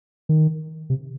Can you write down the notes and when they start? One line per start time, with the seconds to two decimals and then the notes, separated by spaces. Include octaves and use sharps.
0.29 D#3
0.90 C3